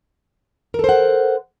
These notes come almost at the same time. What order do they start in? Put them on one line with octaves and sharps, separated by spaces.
A#4 A4 C5 F#5